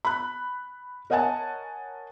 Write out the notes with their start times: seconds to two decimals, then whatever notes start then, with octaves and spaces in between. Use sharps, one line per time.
0.05 B5 F#6
1.10 A#4 C#5 D#5 F#5 G#5 A5